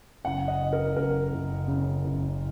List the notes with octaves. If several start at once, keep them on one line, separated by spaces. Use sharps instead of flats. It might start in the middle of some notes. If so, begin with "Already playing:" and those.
F#1 F#5
D#5
C#3
A#4
F#1 A#4
F#1
C#3
F#1